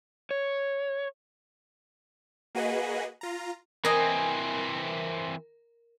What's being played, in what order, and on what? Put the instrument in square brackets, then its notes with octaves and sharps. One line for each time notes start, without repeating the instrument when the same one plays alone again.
[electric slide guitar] C#5
[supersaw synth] A#3 F#4 G#4 B4 D#5
F4 A#5
[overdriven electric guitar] E3 C4 [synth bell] A#4 [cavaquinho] D#5 G#5